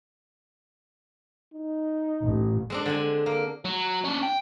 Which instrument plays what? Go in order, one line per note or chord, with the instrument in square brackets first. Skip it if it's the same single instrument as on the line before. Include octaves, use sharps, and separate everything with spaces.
[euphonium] D#4
[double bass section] A1
[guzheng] G#3 C4 D4
D3 G#3 G#5
A#3
[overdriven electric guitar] F#3
C#4 D4
G5